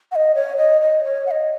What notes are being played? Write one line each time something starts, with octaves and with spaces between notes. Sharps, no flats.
F#5
D#5
C#5
D#5
D#5
C#5
F#5
D#5